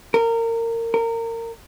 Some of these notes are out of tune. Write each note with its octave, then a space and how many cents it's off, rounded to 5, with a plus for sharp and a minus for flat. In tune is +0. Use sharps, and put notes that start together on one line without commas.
A#4 -25
A#4 -25